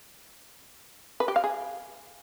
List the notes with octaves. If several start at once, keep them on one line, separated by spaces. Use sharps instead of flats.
B4
G4
F5
G#4